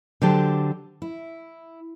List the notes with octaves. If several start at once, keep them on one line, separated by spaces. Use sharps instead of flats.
D3 F#3 G4 C5 A5
E4